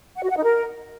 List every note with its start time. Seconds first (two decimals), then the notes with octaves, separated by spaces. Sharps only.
0.16 F#5
0.23 F#4
0.30 F#5
0.36 D#4
0.43 A#4